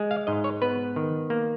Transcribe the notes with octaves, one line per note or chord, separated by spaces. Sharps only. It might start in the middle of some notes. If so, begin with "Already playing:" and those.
Already playing: G#3
F5
G#2 D#5
C#5
B3 B4
D#3
A#3